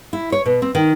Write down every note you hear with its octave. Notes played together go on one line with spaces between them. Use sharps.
E4
C#5
B2
C4
D#3